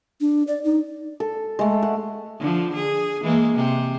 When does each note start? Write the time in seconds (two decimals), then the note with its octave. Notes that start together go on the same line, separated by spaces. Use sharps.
0.21 D4
0.48 D5
0.64 D#4
1.20 A4
1.59 G#3 A3
1.82 F#5
2.39 D3 F3
2.74 G#4
3.22 E3 G#3 A#3
3.55 C3 C4